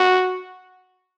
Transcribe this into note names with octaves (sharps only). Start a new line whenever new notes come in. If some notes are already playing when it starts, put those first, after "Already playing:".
Already playing: F#4